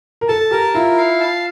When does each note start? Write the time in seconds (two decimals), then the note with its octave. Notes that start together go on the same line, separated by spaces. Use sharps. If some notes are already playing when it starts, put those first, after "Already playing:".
0.21 A#4
0.28 A4 A5
0.51 G4 A#4
0.75 E4 F4
0.97 F5
1.20 A5